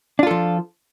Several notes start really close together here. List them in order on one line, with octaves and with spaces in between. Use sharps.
D4 F4 A4 F3